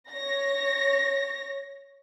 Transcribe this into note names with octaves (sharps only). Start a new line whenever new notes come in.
C#5 A#6